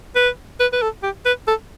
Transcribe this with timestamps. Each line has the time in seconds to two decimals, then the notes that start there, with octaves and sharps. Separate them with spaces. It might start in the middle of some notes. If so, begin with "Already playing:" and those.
0.16 B4
0.60 B4
0.73 B4
0.82 A4
1.03 G4
1.26 B4
1.47 A4